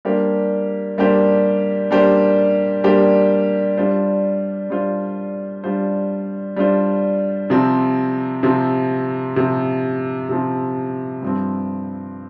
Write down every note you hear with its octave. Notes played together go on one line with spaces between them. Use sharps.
G3 A#3 D4 G4 C5
G3 A#3 D4 G4 C5
G3 A#3 D4 G4 C5
G3 A#3 D4 G4 C5
G3 D4 F4 C5
G3 D4 F4 C5
G3 D4 F4 C5
G3 D4 F4 C5
C3 F3 C4
C3 F3 C4
C3 F3 C4
C3 F3 C4
G2 F3 C4